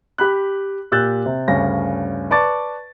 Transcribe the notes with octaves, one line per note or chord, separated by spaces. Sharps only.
G4 B5 F#6
A#2 G4 E6 F#6 G6 A6
C3
D2 G2 C#3 C#4 A#6
B4 D5 A5 C#6 D6 A6